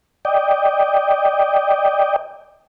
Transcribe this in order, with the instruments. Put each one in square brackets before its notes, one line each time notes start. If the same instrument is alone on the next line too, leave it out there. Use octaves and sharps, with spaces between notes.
[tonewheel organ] D5 D#5 G5